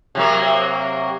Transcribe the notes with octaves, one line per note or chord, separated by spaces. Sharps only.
C3 F#3 A#3